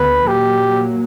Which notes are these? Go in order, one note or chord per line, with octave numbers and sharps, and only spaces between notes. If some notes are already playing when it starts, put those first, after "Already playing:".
Already playing: D2 D3 B3 B4
A#2 F#3 A#3 G4